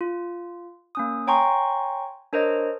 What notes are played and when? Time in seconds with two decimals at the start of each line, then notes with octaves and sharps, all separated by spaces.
0.01 F4
0.95 A#3 C#4 D#6
1.27 C#5 G5 G#5 A#5 C6 C#6
2.33 D4 A#4 C5 C#5 D#5